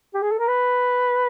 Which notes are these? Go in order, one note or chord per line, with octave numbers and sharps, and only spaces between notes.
G4
G#4
A4
A#4
B4